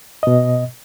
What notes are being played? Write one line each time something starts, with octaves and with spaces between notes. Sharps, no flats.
B2 D#5